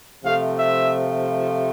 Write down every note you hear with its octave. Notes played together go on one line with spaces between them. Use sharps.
C3 F3 A3 F5
E5